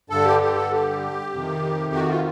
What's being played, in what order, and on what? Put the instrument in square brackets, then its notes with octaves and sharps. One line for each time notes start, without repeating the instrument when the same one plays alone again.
[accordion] G2 D3 A4
G4
G4
A4
G4
F2 C3 D#3
F#4
F4